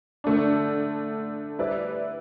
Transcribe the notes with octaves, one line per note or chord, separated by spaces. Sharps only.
D3 A3 D4
G3 E4 B4 D5